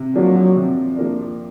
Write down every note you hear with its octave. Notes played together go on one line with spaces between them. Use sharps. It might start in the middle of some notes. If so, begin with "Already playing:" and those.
Already playing: C3
F3 F#3 A#3 D4
C3
F3 A#3 D4